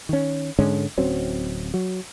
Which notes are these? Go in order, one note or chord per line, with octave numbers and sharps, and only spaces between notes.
D#3 C#4
G#2 D3 G#3 C#4
D1 F#3 C4 C#4
F#3